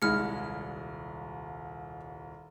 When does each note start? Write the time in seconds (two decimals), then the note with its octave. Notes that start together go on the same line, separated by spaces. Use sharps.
0.02 D#1 C2 G#3 E4 F6 C#7